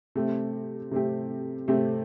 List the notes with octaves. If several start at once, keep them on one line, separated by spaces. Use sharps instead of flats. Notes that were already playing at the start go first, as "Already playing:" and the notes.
C3 A3 C4 G4
C3 A3 C4 G4
C3 A3 C4 G4